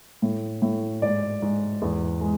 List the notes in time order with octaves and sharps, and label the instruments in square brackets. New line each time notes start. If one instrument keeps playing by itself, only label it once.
[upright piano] A2
A2
G#2 D5
G#2
E2
G#3